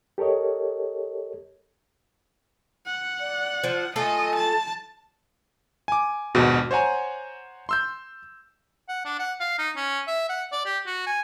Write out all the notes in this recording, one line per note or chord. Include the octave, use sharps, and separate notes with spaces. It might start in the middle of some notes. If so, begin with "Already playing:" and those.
G4 A4 A#4 C#5 D#5
F#5
D5
F3
A3 F4 A4 D#5 G#5
A5
G#5 D6
A#1 D#2 G#2 B2 G#3 F#4
C5 C#5 F#5 G#5 A#5
C6 E6 G6
F#5
D4
F#5
F5
D#4
C#4
E5
F#5
D5
G4
F#4
G#5